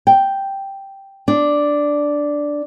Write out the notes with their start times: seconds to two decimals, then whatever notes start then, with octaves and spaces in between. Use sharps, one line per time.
0.07 G5
1.28 D4